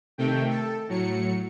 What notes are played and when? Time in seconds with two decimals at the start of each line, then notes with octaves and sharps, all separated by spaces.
0.18 C3 D#3 A3 G5
0.50 A4
0.88 A2 F#3 C#7